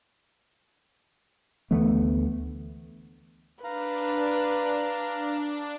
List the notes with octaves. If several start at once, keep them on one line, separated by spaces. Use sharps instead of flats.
D2 E3 A3 B3
D4 B4 F5 A#5